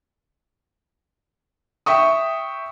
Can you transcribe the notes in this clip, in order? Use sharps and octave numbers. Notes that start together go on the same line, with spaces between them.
E5 G5 C#6 D#6